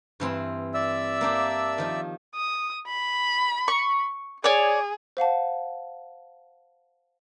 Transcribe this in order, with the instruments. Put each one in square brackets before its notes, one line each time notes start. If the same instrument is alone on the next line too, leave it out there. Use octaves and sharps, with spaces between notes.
[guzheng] G2 E3 C4
[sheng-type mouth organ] D5 E5 E6
[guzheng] A#3 D4 G4
D#3 F3
[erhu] D#6
B5
[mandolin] C#6
[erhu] G#4 [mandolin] C#5 D5
[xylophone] C5 F5 F#5 A5